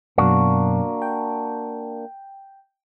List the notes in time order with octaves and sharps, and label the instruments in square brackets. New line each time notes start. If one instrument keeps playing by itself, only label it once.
[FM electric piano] F#2 B2 F#3 [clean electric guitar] A#3 D4 F#4
[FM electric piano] G5